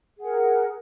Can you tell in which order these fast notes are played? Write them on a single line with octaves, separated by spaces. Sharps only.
G#4 F#5 A#4